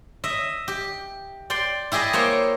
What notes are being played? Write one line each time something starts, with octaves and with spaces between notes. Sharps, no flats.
D#5 E5
G4
D5 G5 C6
E4 G4 G#4 D5 D#5
A#3 C5 C#5 G5